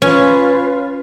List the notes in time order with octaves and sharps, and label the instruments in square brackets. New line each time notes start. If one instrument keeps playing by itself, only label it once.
[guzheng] C#4 [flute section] F4 B4 C#5